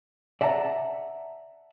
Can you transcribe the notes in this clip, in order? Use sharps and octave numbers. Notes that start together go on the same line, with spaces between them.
D5 E5 F#5 A5 A#5